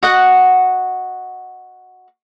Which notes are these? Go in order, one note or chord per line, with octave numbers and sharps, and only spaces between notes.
F#4 D#5 F#5